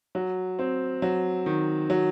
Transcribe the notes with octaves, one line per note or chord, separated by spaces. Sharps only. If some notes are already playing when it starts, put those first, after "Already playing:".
F#3
C4
F#3
D#3
F#3